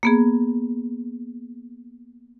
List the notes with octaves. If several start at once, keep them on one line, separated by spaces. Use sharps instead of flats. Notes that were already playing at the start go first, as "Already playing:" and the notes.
A#3 B3 G#4